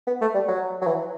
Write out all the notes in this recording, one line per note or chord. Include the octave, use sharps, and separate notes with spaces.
B3
A3
G3
F#3
F#3
E3